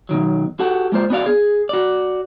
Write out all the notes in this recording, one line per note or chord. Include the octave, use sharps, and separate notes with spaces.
B2 D#3 F#3
F#4 G4 A4 F#5
G#3 A#3 F4 C5 D5
B3 D4 F#4 D5 F5
G#4
F#4 D5